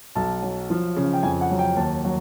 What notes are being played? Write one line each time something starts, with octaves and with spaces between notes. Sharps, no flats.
B1 A5
F#3
F3
C#3
G5
F2 G#5
F#5
F#3
G5
D#2 A5
F#3